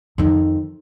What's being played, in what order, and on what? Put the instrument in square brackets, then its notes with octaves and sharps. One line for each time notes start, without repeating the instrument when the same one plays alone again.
[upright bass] F2 D#3